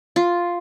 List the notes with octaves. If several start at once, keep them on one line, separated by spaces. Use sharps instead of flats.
F4